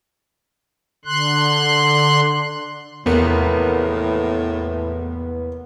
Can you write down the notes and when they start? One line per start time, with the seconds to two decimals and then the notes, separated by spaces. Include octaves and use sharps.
1.05 D3 C6 F#6
3.06 F1 E2 A2 A#3 B3